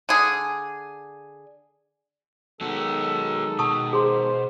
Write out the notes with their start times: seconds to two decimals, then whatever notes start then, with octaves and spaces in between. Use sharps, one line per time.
0.09 D3 G#4
2.61 D#3 F#3 G#3 B3 D#4 F#4 A4
3.59 B2 A5 C#6 D#6
3.93 G#4 C5 C6